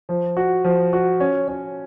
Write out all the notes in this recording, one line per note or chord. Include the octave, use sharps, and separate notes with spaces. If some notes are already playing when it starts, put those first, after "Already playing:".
F3
F#4
F3
F#4
C#4
C#4